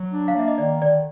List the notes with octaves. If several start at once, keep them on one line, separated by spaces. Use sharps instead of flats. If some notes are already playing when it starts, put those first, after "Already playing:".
Already playing: F#3
D4
F5
A#3 E5
D#5
D#3 D5
D3 D5